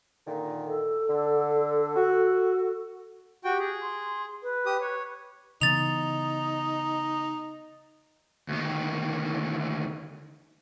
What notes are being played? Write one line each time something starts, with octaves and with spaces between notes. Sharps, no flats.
A#2 D3 D#3
A4
D3
F#4
F#4 G4 G5
G#4
C6
B4
G4 D#6
C#5
C#3 E3 B3 D#4 A6 F7
D2 D#3